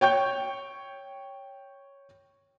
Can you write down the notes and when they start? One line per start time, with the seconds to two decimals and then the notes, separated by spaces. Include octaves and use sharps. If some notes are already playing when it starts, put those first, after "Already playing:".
0.01 C#5 G5 C#6 G6